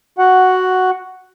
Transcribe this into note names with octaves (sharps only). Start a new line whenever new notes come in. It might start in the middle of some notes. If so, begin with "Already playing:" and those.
F#4 F#5